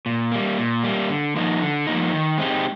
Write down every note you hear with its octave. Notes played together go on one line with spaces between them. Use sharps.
A#2
G3 A#3
A#2
G3 A#3
D3
F3 A#3 D#4
D3
F3 A#3 D#4
D#3
G#3 C4 D#4 G4